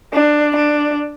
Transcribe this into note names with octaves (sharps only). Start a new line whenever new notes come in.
D4
D4